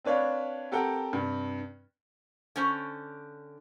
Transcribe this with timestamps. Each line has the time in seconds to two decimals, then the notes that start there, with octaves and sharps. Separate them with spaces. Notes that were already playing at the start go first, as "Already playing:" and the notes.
0.05 C4 D4 B4 C#5 D5 F5
0.71 C4 G4 A4 A#4 F#5 G5
1.13 G2 C3
2.56 D3 C#4 C5